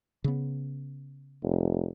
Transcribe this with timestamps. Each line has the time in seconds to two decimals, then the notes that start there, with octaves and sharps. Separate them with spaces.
0.24 C#3 B3
1.42 F1